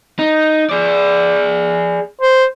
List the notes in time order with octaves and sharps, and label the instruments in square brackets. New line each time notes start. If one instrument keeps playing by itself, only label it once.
[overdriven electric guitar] D#4
G#4 D5
[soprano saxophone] C5